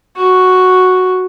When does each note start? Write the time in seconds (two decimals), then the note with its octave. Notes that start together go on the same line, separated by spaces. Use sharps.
0.17 F#4